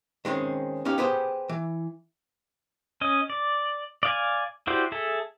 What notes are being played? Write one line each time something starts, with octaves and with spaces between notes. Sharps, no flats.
D#3 G#3 C4 C#4
C#4 D#4 G4 F5
B3 G4 G#4 C5
E3
C#4 D#5
D5
D5 F5 G#5
E4 F#4 G4 C5 D5
G#4 A4 E5